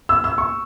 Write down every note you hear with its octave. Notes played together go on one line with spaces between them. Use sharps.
E6
E6
C#6